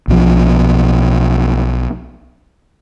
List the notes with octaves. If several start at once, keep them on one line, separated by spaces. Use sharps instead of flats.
B1 B2 F3